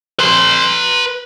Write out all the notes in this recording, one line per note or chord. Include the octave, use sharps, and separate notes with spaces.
B4 C6